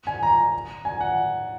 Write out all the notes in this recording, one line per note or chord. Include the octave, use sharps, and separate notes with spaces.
G#5
A#5
G#5
F#5